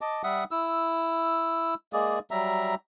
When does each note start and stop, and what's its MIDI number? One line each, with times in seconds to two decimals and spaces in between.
0.01 0.22 75
0.01 0.22 81
0.01 0.22 86
0.24 0.44 55
0.24 0.44 76
0.24 0.44 78
0.24 0.44 87
0.51 1.74 64
0.51 1.74 88
1.93 2.19 56
1.93 2.19 58
1.93 2.19 68
1.93 2.19 74
2.31 2.75 54
2.31 2.75 55
2.31 2.75 76
2.31 2.75 82